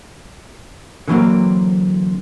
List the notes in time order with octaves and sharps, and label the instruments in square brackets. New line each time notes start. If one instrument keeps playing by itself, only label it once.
[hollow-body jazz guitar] D3 E3 F#3 G3 A#3 C4